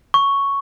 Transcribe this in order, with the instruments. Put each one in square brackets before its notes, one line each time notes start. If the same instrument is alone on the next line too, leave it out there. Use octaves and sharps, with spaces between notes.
[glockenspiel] C#6